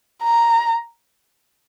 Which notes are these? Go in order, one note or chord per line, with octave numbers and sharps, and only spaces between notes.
A#5